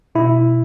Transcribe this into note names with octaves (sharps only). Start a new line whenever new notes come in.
B2 E4